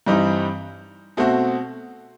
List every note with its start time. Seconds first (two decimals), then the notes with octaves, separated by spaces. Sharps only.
0.06 G2 E3 G3 C4 D#4
1.17 B2 A3 C4 F#4